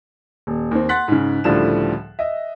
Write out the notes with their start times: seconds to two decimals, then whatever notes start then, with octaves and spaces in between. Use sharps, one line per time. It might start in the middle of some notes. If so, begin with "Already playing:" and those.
0.47 D#1
0.71 D#2 C4
0.89 F#5 C6 F#6 A6 B6
1.08 G#2 C#3
1.44 C#2 A2 D3 F3 G3 E7
2.19 D#5 E5